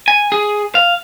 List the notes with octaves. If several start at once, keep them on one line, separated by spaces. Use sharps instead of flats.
G#5
G#4
F5